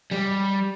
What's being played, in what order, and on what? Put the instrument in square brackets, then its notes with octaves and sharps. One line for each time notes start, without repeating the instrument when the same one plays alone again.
[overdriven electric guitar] G3